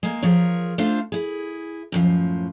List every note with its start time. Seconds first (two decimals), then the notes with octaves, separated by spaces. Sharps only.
0.03 G#3 A#3
0.22 F3 G#4 A#4 C#5
0.78 A3 D4 F4 C5 F5
1.12 E4 G#4
1.92 F#2 A2 F3